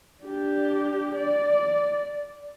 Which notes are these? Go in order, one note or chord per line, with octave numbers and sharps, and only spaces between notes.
D4 G4
D5